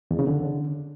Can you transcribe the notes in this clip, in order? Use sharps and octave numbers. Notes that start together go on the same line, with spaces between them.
E2
C#3
D3